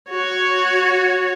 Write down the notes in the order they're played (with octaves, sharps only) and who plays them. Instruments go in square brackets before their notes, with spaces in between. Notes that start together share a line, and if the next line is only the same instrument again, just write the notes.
[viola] F#4 C#5